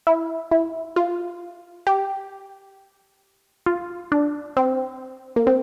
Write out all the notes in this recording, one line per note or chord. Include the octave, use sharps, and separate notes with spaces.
E4
E4
F4
G4
F4
D4
C4
A#3
C4